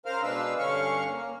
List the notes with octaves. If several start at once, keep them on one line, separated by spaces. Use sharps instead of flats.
C#3 A#4 C5 F5 F6
B2 G#3 D4 B4 F5 E6
G2 D3 C#4 F5 C#6 F6
A#3